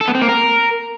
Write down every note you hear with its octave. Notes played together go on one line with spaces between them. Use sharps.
A4
B3
C4
A#3
A#4